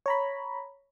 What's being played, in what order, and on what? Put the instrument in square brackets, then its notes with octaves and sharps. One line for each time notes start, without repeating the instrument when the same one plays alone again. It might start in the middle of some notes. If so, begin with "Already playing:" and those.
[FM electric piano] C#5 A#5 B5